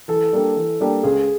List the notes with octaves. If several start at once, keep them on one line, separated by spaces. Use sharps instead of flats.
E3 A4
G3 A#3 D4 G4
E3
G3 A#3 D4 G4
C#2 G#4